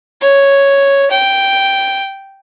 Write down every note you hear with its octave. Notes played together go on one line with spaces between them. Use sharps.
C#5
G5